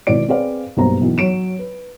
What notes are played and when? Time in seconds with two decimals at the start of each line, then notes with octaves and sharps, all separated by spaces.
0.07 G#1 B2 B3 E4 D5 D7
0.28 C4 G#4 B4 C5 D5 F5
0.77 B1 G2 A#3 C5 A#5
1.01 B1 E3
1.18 F#3 C#5 D7 E7
1.59 B4